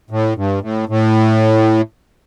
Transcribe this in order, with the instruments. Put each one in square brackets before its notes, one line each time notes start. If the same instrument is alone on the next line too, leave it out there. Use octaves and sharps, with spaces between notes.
[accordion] A2
G2
A2
A2